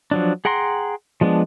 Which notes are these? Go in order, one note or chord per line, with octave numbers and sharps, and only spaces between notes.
F3 F#3 D4
G#4 F#5 G5 A#5 C6
F3 G#3 B3 D4